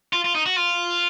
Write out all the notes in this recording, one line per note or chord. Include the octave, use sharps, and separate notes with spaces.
F4
F4
D#4
F#4
F4